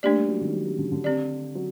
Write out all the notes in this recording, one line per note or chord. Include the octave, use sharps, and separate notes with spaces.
A3 A#3 D4 G4 D5
G3
F#3
D#3
G3
F#3
G3
D3
D3
C4 G4 D5
F#3